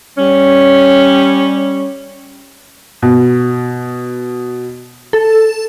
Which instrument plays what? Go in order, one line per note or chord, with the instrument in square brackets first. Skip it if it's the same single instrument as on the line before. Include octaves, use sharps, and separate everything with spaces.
[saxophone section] G3 C#4
[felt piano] B2
[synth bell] A4